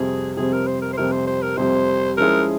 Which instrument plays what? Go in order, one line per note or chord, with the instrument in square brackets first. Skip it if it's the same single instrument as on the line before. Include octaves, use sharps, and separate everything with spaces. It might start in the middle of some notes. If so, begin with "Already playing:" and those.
Already playing: [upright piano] F2 C3 G3 C4 [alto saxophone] G#4
[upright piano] F2 C3 G3 C4 [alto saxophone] G#4
[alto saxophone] A#4
C5
A#4
C5
[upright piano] F2 C3 G3 C4 [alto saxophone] A#4
[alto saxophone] C5
C5
A#4
[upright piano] F2 C3 G3 C4 [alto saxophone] C5
[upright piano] F3 G#3 C#4 E4 G#4 [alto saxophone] A#4